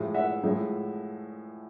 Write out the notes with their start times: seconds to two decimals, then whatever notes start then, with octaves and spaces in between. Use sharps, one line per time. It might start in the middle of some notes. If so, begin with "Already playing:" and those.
Already playing: A2 F3 G#3
0.14 E5 F#5
0.43 A2 F3 G#3